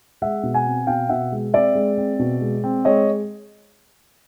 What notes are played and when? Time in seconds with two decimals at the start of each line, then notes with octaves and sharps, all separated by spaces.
0.22 G#3 E5 F#5
0.43 B2
0.54 F#5 G#5
0.65 C4
0.87 B2 F5 G5
1.09 B2 E5 F#5
1.32 G#3
1.54 C4 D5 E5
1.75 G#3
1.97 C4
2.19 B2
2.41 G#3
2.64 C4
2.85 G#3 C#5 D#5